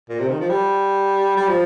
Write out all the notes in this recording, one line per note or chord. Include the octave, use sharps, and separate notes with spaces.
A#2
C3
D#3
F3
G3
G3
F3